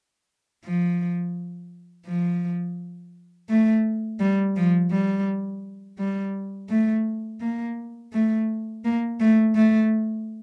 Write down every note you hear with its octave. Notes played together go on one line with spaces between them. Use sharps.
F3
F3
A3
G3
F3
G3
G3
A3
A#3
A3
A#3
A3
A3